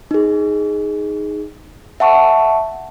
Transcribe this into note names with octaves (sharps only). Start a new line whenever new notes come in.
D#4 G#4
E5 F#5 A5 C#6